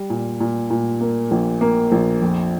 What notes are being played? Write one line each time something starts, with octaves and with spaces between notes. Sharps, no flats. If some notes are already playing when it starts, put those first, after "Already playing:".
Already playing: G3
A#2
A#2
A#2
A#3
A#1
A#3
A#1
F2